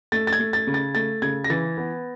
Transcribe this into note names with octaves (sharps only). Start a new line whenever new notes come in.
A3 A6
A6
G#6
A3
A6
C#3
A6
A3 A6
C#3 G#6
A#6
E3 A6
B3